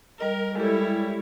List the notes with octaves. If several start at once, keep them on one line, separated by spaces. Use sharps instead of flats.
G3 A#4 D#5
G3 G#3 E4 A4 C#5